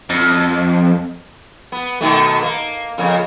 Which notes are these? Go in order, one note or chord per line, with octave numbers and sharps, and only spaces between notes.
F2
B3
B2 D#3 A3
A#3
F2 C#3 A#3